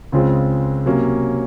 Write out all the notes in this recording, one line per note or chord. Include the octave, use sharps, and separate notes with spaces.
C#2 C#3 G#3 C4 F4
C3 F#3 A#3 C#4